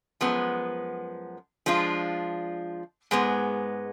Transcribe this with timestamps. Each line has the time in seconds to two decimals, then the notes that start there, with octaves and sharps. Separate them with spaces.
0.21 F#2 F3 G#3 B3
1.66 F3 G#3 D4 F4
3.11 G#2 G#3 B3